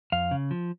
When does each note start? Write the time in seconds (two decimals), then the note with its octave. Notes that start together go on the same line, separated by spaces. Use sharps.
0.12 F2 F5
0.31 C#3
0.51 F3